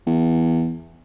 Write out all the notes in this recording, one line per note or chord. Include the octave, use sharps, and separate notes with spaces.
E2